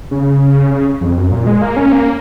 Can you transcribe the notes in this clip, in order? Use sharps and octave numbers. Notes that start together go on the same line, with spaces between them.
C#3
C#3
F2
F#2
A#2
G#3
A#3
C#4
A#3